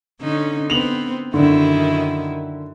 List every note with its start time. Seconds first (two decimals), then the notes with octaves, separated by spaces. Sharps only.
0.21 D3 C#4 D#4
0.70 B3 C4 F7 F#7
1.34 F#2 D3 D#3 E4